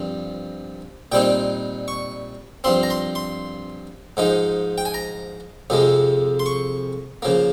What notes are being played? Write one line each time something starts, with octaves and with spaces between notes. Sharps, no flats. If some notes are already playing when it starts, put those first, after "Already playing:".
Already playing: G2 F3 C4
A#2 G3 C4 D#4 G5
C#6
G2 F3 C4 C6
A#5
C6
C6
G#2 F3 G#3 D#4
G5
G#5
A#5
F2 C3 F3 G#3
C6
C#6
C#3 F3 A#3